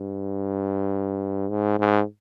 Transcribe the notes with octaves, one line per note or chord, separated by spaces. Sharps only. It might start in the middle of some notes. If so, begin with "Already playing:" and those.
Already playing: G2
G#2
G#2